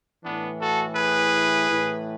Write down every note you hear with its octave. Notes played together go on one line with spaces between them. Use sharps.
A2 E3 B3 D4
F#4 A4
G#4 B4
A2 E3